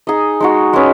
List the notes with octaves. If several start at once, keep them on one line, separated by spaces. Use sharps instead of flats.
D#4 G#4 D#5
G#3 D#4 F#4
G#3 C#4 B4